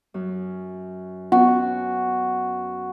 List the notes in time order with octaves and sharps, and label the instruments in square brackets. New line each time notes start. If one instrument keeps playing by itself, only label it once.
[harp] F#2
[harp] B3 C#4 [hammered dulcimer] F#4